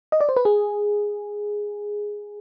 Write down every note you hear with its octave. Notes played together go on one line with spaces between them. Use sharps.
D#5
D5
C5
B4
G#4